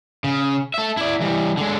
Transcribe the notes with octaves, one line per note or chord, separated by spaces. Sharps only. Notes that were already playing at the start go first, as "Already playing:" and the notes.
C#3
A4 E5
E4 D5
E3 G3
D3 G#3